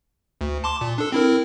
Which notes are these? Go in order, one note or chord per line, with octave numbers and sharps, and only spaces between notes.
D2
A5 C6 D6
A#2
D4 A4
C4 E4 A#4